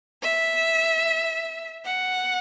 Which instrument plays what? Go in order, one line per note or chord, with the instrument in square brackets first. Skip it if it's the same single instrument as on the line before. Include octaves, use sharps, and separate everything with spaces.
[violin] E5
F#5